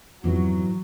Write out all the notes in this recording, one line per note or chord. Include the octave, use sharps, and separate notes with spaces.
F2 G#2 E3 F#3 B3 E4